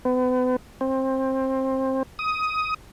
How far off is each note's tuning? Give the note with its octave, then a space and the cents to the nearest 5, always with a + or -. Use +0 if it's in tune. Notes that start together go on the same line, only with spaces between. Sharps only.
B3 +40
C4 +20
D#6 +15